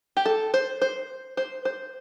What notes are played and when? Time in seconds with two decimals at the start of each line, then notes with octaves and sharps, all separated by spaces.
0.17 G4
0.26 A4
0.54 C5
0.82 C5
1.37 C5
1.65 C5